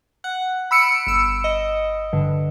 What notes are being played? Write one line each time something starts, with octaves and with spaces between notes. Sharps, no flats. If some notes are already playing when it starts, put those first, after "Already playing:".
F#5
B5 E6 C#7 D7
G1 E6
D#5
G2 D3